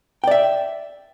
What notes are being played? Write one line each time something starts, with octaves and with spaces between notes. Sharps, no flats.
D5 E5 G5